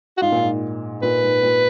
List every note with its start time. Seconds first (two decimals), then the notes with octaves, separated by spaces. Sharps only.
0.18 F#4
0.21 G#2 F4
0.32 A#2
0.43 G#2
1.02 A#2 B4
1.23 G#2
1.43 A#2